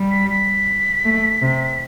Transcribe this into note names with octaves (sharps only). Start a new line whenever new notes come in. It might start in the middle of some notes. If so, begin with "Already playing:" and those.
Already playing: G3
B6
B6
A3
C3